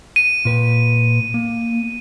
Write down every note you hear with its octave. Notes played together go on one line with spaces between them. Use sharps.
D#7
A#2 B4 G5
A#3